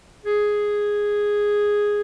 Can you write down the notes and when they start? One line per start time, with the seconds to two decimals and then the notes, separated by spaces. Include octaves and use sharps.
0.25 G#4